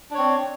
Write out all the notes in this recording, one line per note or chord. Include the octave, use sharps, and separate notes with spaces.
C4 D4 C#5